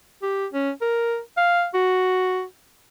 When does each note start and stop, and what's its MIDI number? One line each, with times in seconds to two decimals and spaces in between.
0.22 0.46 67
0.53 0.71 61
0.82 1.19 70
1.37 1.67 77
1.74 2.43 66